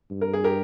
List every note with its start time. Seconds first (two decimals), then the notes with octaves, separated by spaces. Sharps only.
0.11 G2
0.21 A#4
0.33 G#4
0.44 G4 A#4